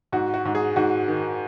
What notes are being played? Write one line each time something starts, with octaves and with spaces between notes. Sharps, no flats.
G#2 F#4
F#4
G#2
G#4
G#2 F#4
D#3